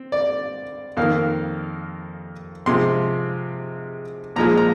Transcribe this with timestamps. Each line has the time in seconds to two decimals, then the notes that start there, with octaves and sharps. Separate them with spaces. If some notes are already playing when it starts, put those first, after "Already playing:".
Already playing: C4
0.12 D5
0.97 F2 D#3 A#3 F5
2.66 C3 F3 G#3 C4 C6
4.36 A#2 F3 G#3 A#5
4.58 A#5